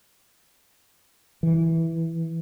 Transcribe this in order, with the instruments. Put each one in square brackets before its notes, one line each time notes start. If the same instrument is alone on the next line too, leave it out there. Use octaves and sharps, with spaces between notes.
[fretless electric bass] E3